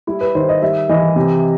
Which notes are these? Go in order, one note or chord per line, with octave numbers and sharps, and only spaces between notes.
G3 E4
B4
D#3 C5
D#5
G3 E5
E3 D#5
C3